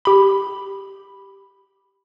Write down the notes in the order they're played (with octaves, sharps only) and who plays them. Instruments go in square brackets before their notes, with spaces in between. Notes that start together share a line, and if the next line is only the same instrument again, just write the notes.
[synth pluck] G4 B5